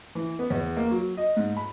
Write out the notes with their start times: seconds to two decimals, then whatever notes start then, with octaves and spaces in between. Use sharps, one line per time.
0.15 E3
0.39 B3
0.50 E2
0.77 A#3
0.91 F#3
1.17 D#5
1.37 G#2
1.57 B5